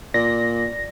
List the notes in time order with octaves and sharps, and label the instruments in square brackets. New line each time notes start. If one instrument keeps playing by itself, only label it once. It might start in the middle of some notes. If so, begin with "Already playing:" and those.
[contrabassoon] A#2 [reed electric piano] D5 [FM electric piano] A#6